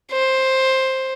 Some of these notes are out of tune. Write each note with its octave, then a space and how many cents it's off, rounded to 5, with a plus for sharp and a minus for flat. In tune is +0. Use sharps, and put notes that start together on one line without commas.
C5 +10